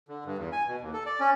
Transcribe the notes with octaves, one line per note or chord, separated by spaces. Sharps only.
D3
G2
E2
G#5
B2
D#2
A4
D5
C#4